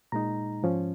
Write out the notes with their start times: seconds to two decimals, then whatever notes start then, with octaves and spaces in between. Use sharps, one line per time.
0.12 A#2 G#3 D#4 A#5
0.63 G#2 F3 C#4